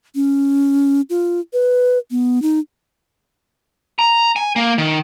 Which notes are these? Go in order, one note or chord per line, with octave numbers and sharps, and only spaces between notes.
C#4
F4
B4
B3
D#4
A#5
G#5
A#3
D#3